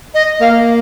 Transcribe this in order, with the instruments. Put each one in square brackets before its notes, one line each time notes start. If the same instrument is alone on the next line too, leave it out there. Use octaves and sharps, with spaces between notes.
[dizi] D#5
[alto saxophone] A#3 [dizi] F5